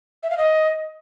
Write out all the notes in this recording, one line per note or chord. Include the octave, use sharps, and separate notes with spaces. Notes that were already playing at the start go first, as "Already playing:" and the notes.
E5
F5
D#5